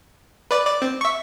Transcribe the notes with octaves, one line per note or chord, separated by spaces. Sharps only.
B4 D5
D5
C4
E5 C#6